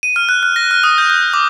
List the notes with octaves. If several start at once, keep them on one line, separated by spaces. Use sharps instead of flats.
D#7
F6
F#6
F#6
A#6
F6
D#6
G6
G6
D6